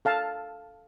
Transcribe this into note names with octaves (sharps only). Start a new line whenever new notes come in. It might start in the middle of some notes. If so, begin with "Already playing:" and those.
A4 F5 A5